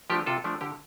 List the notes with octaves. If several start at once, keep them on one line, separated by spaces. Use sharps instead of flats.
F3 A3 D4 G4
C3 F4 A4
F3 A3 D4
D3 G4